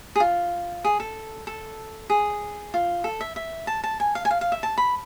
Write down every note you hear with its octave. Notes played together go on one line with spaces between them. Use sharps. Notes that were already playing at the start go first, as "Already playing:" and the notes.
G#4
F4
G#4
A4
A4
G#4
F4
A4
E5
E5
A5
A5
G#5
F5
G#5
F5
F5
E5
A5
B5